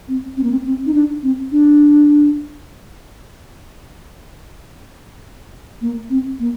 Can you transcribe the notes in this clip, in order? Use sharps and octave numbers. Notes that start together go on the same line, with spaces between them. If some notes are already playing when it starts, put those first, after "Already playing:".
C4
C4
A#3
C4
C4
D#4
D4
C4
D4
A#3
C4
A#3